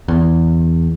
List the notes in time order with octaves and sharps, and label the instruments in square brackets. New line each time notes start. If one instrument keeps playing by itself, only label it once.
[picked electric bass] E2